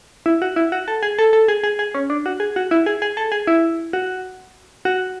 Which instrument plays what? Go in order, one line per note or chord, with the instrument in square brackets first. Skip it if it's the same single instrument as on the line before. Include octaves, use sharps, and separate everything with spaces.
[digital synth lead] E4
F#4
E4
F#4
A4
G#4
A4
A4
G#4
G#4
G#4
C#4
D4
F#4
G#4
F#4
E4
G#4
G#4
A4
G#4
E4
F#4
F#4